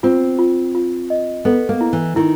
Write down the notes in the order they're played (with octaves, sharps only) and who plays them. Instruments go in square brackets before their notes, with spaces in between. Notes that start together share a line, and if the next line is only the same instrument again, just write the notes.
[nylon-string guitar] C4 [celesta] F4
[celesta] F4
F4
D#5
[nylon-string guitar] B3 [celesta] A4
[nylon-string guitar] A#3
[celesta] E4
[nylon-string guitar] E3
[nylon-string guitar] D#3 [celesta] E4